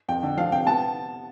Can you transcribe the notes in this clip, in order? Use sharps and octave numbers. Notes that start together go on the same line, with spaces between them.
F2 G5
D3
F3 F5
C3 G5
B3 A5